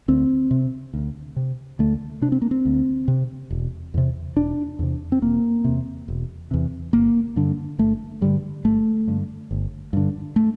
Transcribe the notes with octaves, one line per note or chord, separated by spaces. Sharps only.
D2 C4
C3
D2
C3
D2 A3
C3 D4
C4
A#3
C4
D2
C3
E1
E2 C3
E1 D4
E2 C3
C4
E1 A#3
E2 C3
E1
E2 C3
G1 A#3
G2 D3
G1 A3
G2 D3 G3
G1 A3
G2 D3
G1
G2 D3
A3